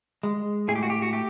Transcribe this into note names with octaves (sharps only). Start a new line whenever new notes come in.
G#3
A2 G#4
G4
F#4
G4
F#4
A3 G4